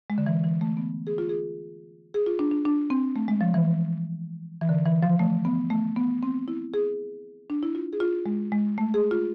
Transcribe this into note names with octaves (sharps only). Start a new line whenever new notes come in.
G#3
D3
E3
E3
A3
B3
G#4
F4
G#4
G#4
F4
D4
D4
D4
C4
A3
G#3
F3
E3
E3
D3
E3
F3
A3
B3
A3
B3
C4
E4
G#4
D4
E4
F4
G#4
F4
G#3
G#3
A3
G#4
F4